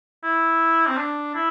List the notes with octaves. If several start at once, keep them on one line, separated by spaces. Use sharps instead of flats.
E4
C4
D4
E4